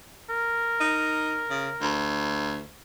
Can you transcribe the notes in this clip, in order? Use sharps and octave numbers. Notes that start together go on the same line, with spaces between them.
A#4
D#4
C#3
D2